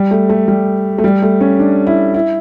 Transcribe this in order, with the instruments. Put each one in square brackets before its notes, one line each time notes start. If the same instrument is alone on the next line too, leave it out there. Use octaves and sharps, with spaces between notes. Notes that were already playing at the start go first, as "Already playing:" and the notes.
Already playing: [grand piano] G3
A3
A3
G3
A3
G3
A3
C#4
D4
E4
E4